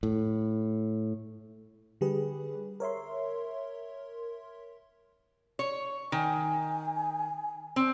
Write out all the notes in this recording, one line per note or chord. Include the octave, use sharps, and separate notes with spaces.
A2
D3 G3 G4 G#4 B4
A#4 C#5 E5 C6
C#5
D#3 G#5
C4